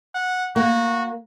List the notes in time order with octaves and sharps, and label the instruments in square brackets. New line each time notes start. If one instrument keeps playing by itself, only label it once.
[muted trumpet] F#5
[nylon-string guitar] A#3 [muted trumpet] F#4